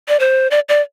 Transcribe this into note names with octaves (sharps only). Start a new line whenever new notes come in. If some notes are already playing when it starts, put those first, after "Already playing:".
D5
C5
D5
D5